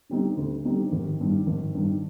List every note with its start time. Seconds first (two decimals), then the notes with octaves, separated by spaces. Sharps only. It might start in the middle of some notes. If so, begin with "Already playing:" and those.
0.09 D3 G3 C4 D#4
0.37 D2
0.65 D3 G3 C4 D#4
0.92 G#1
1.20 G2 D#3
1.46 G#1
1.75 G2 D#3